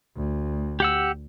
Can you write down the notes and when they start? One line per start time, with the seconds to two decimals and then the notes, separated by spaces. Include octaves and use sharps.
0.16 D2
0.80 G4 F#5 E6